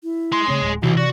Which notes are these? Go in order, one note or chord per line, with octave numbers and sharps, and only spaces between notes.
E4
G#4 C6
C#3 C4 C#5
D1 G#3
B1 C3 E3 F#4
F#4 D5